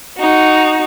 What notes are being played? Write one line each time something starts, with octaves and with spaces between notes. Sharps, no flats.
D#4 F#4